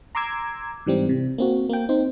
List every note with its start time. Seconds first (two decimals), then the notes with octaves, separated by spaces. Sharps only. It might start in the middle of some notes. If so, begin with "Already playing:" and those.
0.15 A#5 C6 D6 E6 G#6
0.86 G#2 E3 G3 C4
1.09 C3
1.38 A#3 C4 F#4
1.69 A#3 G5
1.89 C4 D#4 C5